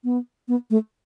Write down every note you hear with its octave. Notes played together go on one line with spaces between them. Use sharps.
B3
B3
A3